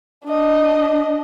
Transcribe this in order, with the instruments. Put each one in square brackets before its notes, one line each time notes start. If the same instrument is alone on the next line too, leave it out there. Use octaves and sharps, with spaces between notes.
[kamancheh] D4 D#5